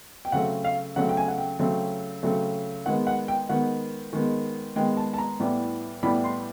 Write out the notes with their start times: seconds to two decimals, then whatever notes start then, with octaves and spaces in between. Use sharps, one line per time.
0.25 G5
0.32 C#3 F#3 A3 C4 F#5
0.64 F5
0.96 C#3 F#3 A3 C4 F#5
1.09 G5
1.17 G#5
1.28 F#5
1.38 G5
1.59 C#3 F#3 A3 C4
2.23 C#3 F#3 A3 C4
2.86 D#3 G#3 B3 F#5
3.07 F#5
3.28 G5
3.49 D#3 G#3 B3 F#5
4.13 D#3 G#3 B3
4.76 D#3 G#3 B3 G5
4.97 A5
5.13 A5
5.18 A#5
5.40 A2 E3 G3 B3
6.03 A2 E3 G3 B3 B5
6.24 C6